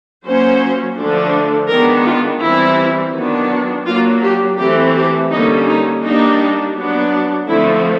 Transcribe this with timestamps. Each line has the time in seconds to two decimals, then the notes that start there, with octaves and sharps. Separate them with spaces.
0.24 F#3 A#3 C#4 C5
0.96 D3 F3 A3 D4
1.68 D#3 G#3 B3 D4 A#4
2.05 F4
2.41 E3 G3 C4 E4
3.14 D#3 F#3 B3 D4
3.86 F#3 A#3 D4 F4
4.22 G4
4.58 E3 A3 C4 G4
4.95 G4
5.31 D3 G3 A#3 C#4 D#4
5.67 D#4
6.03 G3 A#3 D4 D#4
6.75 F#3 B3 D4
7.48 D3 F3 A3 C4 E4